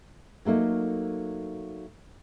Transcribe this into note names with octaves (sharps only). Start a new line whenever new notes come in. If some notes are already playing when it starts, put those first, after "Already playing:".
F#3 A3 A#3 D#4